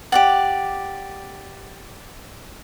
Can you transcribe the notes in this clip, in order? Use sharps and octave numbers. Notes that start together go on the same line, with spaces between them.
G4 D5 F#5